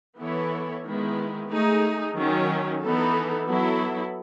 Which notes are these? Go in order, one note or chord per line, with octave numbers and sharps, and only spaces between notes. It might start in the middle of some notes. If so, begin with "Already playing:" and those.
E3 B3 E4 A4 C#5
D#3 G#3 B3 E4
A3 D#4 G#4
D#3 F#3 C#4
E3 B3 D#4 A4
F#3 B3 E4 A4